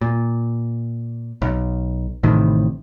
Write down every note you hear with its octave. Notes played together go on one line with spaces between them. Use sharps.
A#2
B1
A1 A2 C3 D#3